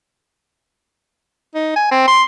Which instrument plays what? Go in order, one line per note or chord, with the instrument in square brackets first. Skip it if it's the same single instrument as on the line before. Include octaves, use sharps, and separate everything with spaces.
[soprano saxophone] D#4
G#5
C4
C6